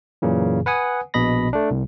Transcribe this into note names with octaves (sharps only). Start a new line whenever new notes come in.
F#2 A#2 C#3 E3
B4 F#5 G#5 D#6
A#1 B2 D#5 B5 A#6
A3 D4
C2